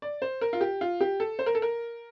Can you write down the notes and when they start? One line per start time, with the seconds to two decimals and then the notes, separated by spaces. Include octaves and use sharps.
0.02 D5
0.22 C5
0.41 A#4
0.53 F4
0.61 G4
0.81 F4
1.01 G4
1.20 A4
1.39 C5
1.46 A#4
1.55 A4
1.62 A#4